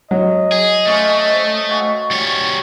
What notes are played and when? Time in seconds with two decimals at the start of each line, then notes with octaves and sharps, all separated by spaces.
0.11 F#3 D#5
0.52 G#4
0.87 A3 C#4 F4
1.29 C5
1.69 F#4 F5 G#5
2.11 G3 C#5